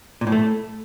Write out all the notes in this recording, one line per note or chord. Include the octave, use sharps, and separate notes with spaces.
A#2
A2
A3